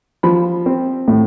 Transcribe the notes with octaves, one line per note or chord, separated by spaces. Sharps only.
F3 B5
C4
A2